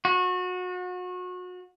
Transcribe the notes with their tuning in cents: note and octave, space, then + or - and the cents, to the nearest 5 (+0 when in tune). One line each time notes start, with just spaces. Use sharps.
F#4 -30